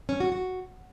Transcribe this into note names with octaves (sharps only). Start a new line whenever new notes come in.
C#4
F#4
F#4